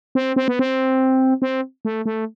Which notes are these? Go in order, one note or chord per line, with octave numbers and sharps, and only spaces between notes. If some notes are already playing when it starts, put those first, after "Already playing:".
C4
C4
B3
C4
C4
A3
A3